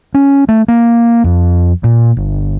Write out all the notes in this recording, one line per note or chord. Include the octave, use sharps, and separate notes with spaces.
C#4
A3
A#3
F2
A#2
G1